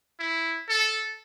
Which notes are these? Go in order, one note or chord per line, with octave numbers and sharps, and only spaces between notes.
E4
A4